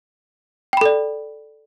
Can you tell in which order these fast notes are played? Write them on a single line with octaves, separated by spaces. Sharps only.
G5 B5 A4 D5